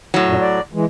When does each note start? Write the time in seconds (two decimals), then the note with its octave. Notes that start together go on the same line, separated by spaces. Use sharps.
0.14 A2 F#3
0.26 F#2 A#2
0.41 D5
0.74 E3 G#3